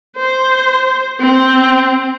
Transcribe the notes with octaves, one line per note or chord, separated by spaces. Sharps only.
C5
C4